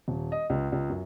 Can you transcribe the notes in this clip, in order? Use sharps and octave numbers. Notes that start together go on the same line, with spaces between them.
D#1
D#5
C#2
C#2
F#2